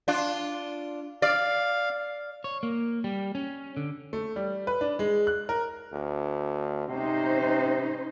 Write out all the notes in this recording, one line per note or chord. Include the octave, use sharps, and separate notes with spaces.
D4 F4
D5 F5
C#5
A#3
G3
C#4
D3
A3
G3
B4
D4
G#3
F#6
A#4
D2
C3 C#4 D#4 C5